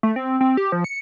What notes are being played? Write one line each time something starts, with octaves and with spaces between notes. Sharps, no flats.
A3
C4
C4
G4
F3
C#7